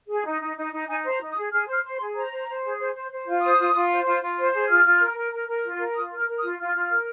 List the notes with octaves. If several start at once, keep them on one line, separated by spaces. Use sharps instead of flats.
G#4
D#4
D#4
D#4
D#4
D#4 G#5
C5
A#5
D#4
D#6
G#4
G#4 F6
C5
F6
C5
C6
G#4
C5 A#5
C5
C5
G#4
C5
C5
C5
F4
C5 D#6
F4
F4
C5
F4
F4
C5
G#4
F4 F6
F4
A#4
A#4
A#4
A#4
F4
A#4
F4 D#6
A#4
F6
A#4
D#6
F4
F4 F6
F4
A#4